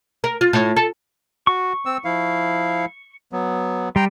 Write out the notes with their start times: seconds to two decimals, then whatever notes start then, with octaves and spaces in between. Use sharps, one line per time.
0.24 A#4
0.41 F4
0.53 A2
0.76 A4
1.47 F#4 C#6
1.86 C4 E6
2.05 F3 E4 F5
3.32 F#3 B3
3.96 G3 G5 A#5 C6